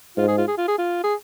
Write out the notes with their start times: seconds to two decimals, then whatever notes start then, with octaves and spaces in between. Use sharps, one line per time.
0.17 G#2 F4
0.28 G#4
0.38 F4
0.48 G#4
0.58 F4
0.68 G#4
0.78 F4
1.04 G#4